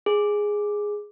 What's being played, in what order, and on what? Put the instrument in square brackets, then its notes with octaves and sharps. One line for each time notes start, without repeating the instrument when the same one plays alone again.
[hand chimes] G#4